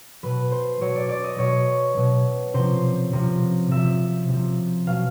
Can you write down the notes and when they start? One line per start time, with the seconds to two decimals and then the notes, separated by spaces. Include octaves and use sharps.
0.23 B2 F#3 B4
0.51 C5
0.81 B2 F#3 C#5
0.96 D5
1.09 D5
1.24 D#5
1.38 B2 F#3 C#5
1.97 B2 F#3
2.54 C3 F3 C5
3.12 C3 F3
3.71 C3 F3 E5
4.28 C3
4.33 F3
4.87 B2 F#3 F5